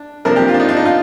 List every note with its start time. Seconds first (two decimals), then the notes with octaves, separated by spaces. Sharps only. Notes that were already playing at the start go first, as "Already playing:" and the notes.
Already playing: D4
0.25 C3 F3 A#3 D4 A#4
0.36 G4
0.48 F4
0.54 D4
0.60 D#4
0.69 D4
0.77 D#4
0.85 F4